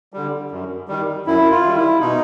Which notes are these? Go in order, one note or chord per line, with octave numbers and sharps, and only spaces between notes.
D3 G3
F#2
D#3 G3
F#2 E4
F4
D#3 G3
E4
B2 D#4